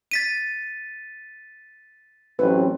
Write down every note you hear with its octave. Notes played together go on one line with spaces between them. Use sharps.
A6 B6 D#7
A1 F#3 C4 B4